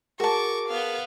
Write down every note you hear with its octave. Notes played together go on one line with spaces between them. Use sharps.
F#4 G#4 A#4 A5 C#6 D6
B3 F5